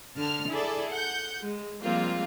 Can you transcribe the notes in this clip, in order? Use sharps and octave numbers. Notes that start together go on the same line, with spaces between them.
D3 A5 F6
E4 G#4 A4 D5
F#5 G6
G#3
F3 G3 G#3 A#3 C4 F4